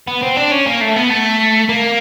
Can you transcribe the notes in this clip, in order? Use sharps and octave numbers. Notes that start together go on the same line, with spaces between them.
B3
C4
D4
C#4
A#3
A3
B3
A3
A#3